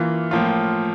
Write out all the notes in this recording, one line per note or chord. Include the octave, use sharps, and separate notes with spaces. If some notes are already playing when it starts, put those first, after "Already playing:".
Already playing: E3 A#3 F4
A2 F3 A#3 F4